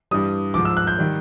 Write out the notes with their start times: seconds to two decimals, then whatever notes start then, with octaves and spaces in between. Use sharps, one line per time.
0.11 G2 E3 G3 D#6
0.54 G#2 F3 D6
0.65 E6
0.77 F#6
0.87 G6
0.99 D#3 G3